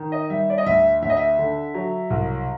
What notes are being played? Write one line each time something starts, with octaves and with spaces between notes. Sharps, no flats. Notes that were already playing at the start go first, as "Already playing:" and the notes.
Already playing: D#3
D#5
G3 E5
D5
D#5
D2 E5
D2 E5
D#5
E5
D3
F#3
C2